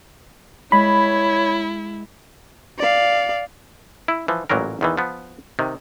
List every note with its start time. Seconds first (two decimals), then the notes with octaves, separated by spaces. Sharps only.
0.72 G#3 E4 C#5 B5
2.79 D5 F5
4.08 E4
4.28 E3 F3
4.50 A1 A#2 F#3 G3 A#4
4.81 E2 D#3 E3
4.97 F3 B3
5.59 C3 D#3